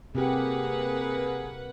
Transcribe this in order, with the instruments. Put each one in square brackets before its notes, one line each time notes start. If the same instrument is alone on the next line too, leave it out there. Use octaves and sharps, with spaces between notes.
[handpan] C3 G4 [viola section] A#3 B4 F#5 [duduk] G#4